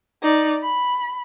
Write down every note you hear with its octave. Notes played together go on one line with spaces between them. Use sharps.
D#4 D5
B5